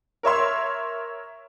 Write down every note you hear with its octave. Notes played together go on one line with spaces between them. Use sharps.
A#4 C#5 E5 C6